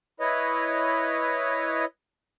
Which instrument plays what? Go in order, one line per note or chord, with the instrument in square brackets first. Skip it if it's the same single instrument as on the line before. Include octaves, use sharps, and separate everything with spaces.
[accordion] E4 B4 C#5 D#5